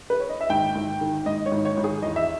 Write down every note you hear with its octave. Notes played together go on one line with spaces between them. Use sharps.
B4
C#5
D#5
E5
G#1 G5
G#1
D#3
G#2 D#5
C#5
G#1
C#5
G#1
G#4
E1 D#5
E5